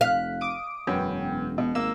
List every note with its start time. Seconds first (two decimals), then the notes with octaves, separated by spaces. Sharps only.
0.01 F1 F5 F#6 B6
0.41 D6 D#6 D7
0.87 E1 F#2 B3 C#4 G5
1.58 B2
1.75 G#1 A#3 E6